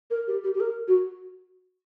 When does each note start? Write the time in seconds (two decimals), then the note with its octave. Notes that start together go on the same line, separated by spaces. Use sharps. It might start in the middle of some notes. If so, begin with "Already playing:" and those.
0.11 A#4
0.28 G4
0.44 G4
0.54 G4
0.60 A#4
0.88 F#4